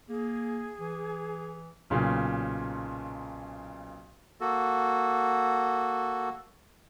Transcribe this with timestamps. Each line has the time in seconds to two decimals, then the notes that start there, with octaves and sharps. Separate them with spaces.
0.09 A#3 G#4
0.79 E3
1.90 B1 A#2 C#3
4.41 A#3 F#4 A4